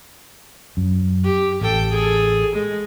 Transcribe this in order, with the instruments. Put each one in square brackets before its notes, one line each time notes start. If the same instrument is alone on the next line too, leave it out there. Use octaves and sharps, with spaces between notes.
[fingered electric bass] F#2
[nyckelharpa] G4
[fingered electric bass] A1 [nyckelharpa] A4 G5
[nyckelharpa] G#4 A4
G#3